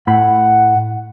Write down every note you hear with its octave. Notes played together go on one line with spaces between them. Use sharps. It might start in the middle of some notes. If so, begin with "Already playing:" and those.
A2 F#5 B5